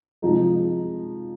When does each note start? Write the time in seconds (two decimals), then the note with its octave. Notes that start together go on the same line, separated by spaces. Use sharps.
0.22 C3 F3 G#3 D#4